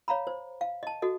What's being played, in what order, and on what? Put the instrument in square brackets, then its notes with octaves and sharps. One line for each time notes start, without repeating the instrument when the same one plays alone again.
[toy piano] C#5 F5 A#5 B5
C5
F5
D#5 A5
F#4 A4 D#5